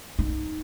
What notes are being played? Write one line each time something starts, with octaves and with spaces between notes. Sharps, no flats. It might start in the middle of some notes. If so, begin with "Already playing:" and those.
D#4